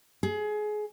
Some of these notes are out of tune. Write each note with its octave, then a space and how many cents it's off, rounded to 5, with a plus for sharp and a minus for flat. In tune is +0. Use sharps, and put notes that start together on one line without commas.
G#4 +25